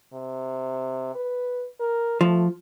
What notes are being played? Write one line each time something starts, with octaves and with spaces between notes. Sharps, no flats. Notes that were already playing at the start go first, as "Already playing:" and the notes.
C3
B4
A#4
F3 A3